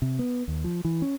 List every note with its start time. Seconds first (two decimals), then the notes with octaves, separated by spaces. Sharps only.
0.02 C3
0.19 B3
0.48 D#2
0.64 F3
0.85 E3
1.02 C#4